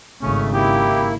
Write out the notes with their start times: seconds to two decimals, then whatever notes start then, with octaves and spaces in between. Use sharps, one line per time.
0.22 G#1 C#3 A3 C#4
0.54 A#3 E4 G4